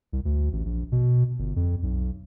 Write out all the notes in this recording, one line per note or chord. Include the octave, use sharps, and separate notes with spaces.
C2
D2
A1
A#1
B2
G1
F2
B1